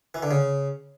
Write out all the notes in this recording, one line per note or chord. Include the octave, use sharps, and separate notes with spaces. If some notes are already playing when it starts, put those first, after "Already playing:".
E3
D3
C#3